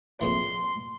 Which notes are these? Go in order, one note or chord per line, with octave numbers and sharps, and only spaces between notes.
F2 C#3 E3 C6